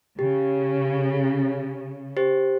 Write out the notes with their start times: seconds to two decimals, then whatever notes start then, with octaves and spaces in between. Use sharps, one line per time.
0.19 C#3 G4
2.17 G4 C5